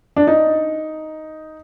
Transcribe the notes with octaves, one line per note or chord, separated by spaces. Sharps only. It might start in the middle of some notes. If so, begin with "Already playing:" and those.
D4
D#4